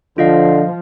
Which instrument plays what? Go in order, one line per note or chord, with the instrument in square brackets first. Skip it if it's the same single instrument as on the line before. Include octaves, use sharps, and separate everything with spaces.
[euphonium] D3 [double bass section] F3 [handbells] F4 D#5 F5